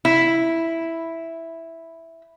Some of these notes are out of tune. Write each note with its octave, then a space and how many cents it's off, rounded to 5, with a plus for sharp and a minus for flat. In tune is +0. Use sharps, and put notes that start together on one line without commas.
E4 +0